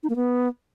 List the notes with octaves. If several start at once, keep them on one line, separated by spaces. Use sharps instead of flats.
D#4
A#3
B3